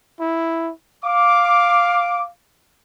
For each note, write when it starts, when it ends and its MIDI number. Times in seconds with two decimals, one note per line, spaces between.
0.20 0.72 64
1.05 2.29 77
1.05 2.24 86